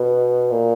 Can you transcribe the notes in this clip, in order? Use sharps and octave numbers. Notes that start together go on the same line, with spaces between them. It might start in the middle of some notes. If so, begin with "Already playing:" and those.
Already playing: B2
A#2